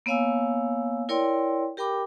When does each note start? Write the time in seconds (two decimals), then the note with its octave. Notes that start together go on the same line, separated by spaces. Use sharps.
0.06 A#3 B3 C#5 F5 G#5 E6
1.09 E4 A#4 C#5 D5 G5 C6
1.77 G4 A#4 G5 B5 D6